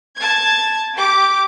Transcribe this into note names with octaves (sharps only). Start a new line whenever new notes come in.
A5 G#6
G4 D6